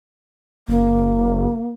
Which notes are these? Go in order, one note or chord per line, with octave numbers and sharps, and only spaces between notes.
F#1 A#3